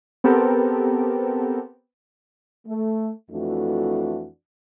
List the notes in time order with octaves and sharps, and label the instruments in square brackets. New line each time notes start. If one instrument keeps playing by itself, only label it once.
[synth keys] B3 C4 G4 A4 A#4
[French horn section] A3
F2 E3 A3 D4 F#4